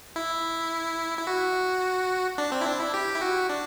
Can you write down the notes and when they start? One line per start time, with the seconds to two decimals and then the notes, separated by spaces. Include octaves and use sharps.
0.16 E4
1.19 E4
1.27 F#4
2.38 D4
2.52 C4
2.61 E4
2.66 D4
2.80 E4
2.94 G4
3.15 E4
3.21 F#4
3.49 D4